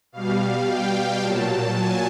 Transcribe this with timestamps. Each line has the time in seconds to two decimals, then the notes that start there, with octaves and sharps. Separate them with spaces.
0.12 B2 G3 F5
0.67 G5
1.22 A#2 F#3 A5
1.77 G#5